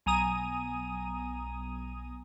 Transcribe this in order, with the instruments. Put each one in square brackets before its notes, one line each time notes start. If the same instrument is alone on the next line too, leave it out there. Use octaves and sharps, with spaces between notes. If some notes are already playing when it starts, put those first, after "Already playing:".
[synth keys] B1 G#5 A#5 D#6 D#7